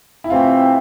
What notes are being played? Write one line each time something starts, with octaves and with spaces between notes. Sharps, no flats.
E4
C3 E3 A3 C4 F4